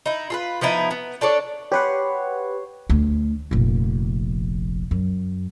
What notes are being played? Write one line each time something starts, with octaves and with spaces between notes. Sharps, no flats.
D#4 E4
F4 A4 B4
F3 B3 D#4 E4
B3
D4 A4 C#5 D5
G4 B4 C#5 F#5 C6
D2
F1 A#1
F#2